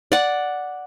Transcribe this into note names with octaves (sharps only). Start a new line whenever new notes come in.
D5 F#5